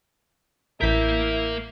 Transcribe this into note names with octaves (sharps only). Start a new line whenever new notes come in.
A1 A#3 E4 A#4 G6 B6